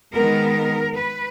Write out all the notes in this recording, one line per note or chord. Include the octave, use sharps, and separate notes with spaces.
D#3 G#3 B3 A#4
B4